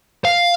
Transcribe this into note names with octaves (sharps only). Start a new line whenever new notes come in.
F5